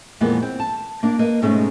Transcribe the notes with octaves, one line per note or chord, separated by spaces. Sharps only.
F2 A#2 E3 G#3 A#3 B3
C4
A5
A#3 D4
A#3 B4 D#5
G#2 B2 G#3 A3 C#4 D#4